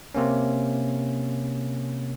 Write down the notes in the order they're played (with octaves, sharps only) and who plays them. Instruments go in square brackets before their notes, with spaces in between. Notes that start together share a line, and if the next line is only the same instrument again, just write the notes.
[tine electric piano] C3 A#3 C#4